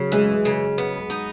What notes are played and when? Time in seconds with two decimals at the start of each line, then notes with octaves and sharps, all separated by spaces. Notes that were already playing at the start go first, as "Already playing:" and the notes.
Already playing: C#3 F#3
0.12 E3 G#3
0.45 C#3
0.78 B3
1.10 D#4